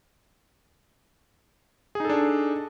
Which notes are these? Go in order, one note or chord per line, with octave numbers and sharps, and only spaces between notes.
D4 D#4 G#4 A4